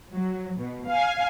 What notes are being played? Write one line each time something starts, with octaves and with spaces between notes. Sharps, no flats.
F#3
B2
F5 G#5